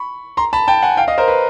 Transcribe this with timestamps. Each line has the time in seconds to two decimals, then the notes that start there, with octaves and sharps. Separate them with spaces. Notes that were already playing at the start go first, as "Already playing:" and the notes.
Already playing: B5 C#6
0.37 A#5 C6
0.53 A5 B5
0.68 G5 A5
0.83 F#5 G#5
0.97 F5 G5
1.08 D#5 F5
1.18 A#4 C5
1.28 B4